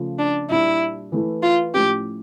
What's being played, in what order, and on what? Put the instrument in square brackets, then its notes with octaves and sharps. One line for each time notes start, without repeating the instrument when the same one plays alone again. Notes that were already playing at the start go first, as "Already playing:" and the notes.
Already playing: [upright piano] C#3 F3 A3
[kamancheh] D4
[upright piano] A#2 G3 D4 [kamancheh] E4
[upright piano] E3 A3 E4
[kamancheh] F4
[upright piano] A2 F3 C#4 [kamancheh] G4